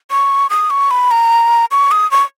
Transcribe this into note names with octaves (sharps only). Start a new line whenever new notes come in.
C#6
D#6
C#6
B5
A#5
C#6
D#6
C#6